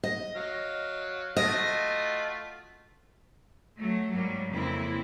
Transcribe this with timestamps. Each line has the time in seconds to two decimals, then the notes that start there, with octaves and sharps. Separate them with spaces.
0.04 D#5
0.35 F#3 F5
1.37 A3 F4 F#4 D#5
3.79 F#3 A3
4.12 G#2 F#3 G3 A#3
4.50 F2 C#3 A#3 C4 E4